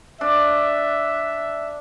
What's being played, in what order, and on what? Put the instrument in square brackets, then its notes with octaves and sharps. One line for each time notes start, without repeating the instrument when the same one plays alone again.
[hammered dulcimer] D4 [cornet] E5